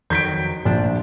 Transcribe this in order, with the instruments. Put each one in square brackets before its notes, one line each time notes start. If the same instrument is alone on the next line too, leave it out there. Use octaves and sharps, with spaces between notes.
[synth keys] F2 D#3 F#3 [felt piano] G6 B6 D7
[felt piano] A#1 [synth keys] F3 D4